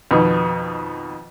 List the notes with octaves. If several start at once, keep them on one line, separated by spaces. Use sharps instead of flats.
F2 B2 D#3